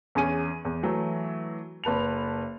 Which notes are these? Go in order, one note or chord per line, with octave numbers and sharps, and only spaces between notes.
E2 C#4 G#4 D#7
E2
E3 F#3 A3
F#1 B4 A5 F7